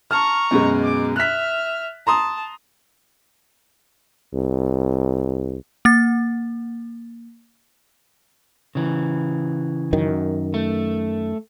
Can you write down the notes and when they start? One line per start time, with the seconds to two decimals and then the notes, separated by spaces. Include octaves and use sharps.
0.11 A5 A#5 C#6 F6
0.51 F#2 B2 G#3
0.84 D6
1.16 E5 F6 F#6 B6
2.07 A5 A#5 C6 D#6
4.34 C2
5.85 A#3 A6
8.75 C#3 E3
9.93 F#2 D#3
10.54 A3